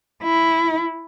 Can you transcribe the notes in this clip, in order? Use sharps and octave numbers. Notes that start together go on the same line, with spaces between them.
E4